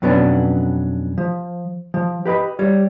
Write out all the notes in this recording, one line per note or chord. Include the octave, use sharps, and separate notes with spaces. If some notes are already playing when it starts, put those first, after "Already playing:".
F2 B2 F#3 B3 C#4 D4
F3
F3
G4 B4 D#5 B5
G3 C#5